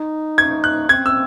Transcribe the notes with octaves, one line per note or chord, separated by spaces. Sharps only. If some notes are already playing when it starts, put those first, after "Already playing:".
Already playing: D#4
G#6
F#6
C4 G#6
E6